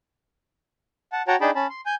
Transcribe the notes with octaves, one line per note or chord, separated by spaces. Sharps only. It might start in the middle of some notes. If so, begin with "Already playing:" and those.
F#5 A5
F#4 C#5 F#5 G5 A5 A#5
D4 D#4 G#4 G5 A5 B5
C#4 A5 B5
C6
G#5 G6